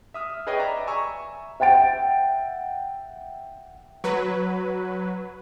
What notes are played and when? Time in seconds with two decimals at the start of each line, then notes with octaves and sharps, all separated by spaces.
0.14 E5 D#6 F6
0.47 G#4 B4 C#5 D#5 G5 G#5
0.59 D5 E5 A#5 B5
0.87 E5 G#5 A#5 C#6 E6
1.60 E5 F#5 G5 A6 D7
4.04 F#3 B4